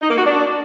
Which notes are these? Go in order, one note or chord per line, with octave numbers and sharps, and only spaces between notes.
D#4
A#3
F#4
D4